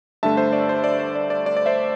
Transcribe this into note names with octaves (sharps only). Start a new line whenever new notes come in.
G2 D3 A3 E5 A5
C5 E5
D5
C5
D5
C5
D5
D5
D5
D5
C5 E5